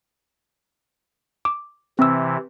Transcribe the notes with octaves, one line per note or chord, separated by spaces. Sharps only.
D6
C3 E3 C4 E6